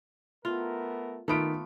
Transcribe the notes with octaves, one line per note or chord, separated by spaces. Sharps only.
A3 B3 F4 A#4
D#3 A3 B3 F4 D7